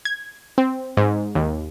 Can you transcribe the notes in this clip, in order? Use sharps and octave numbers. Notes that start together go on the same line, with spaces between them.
G#6
C4
G#2
D#2